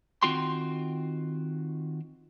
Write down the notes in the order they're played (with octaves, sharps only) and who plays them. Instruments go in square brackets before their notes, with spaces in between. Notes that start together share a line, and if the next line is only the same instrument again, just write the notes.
[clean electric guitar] D#3 C4 F4 F#4 G5 C6